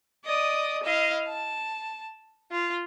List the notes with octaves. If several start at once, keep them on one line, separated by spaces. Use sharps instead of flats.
D5 D#5 D#6
E4 D#5 F5
A5
F4